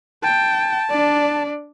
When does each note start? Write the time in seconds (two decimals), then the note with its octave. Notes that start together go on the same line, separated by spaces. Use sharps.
0.23 G5 A5
0.90 D4 D5